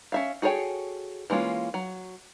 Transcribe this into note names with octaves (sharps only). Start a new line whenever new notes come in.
C#4 E5 F5
F#4 G#4 A4 C#5 G5
E3 G#3 A#3 C#4 F4
F#3